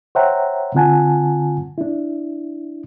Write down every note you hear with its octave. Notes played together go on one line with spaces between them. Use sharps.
C5 C#5 E5 F#5 G5 A#5
D3 C4 F4 F#5 G#5 A5
D4 E4